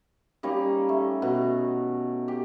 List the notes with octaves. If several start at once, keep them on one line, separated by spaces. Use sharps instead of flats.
G3 A#3 C#4 D#4
A3
B2
G4